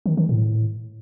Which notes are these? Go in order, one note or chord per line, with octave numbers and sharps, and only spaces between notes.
D#3
D#3
A2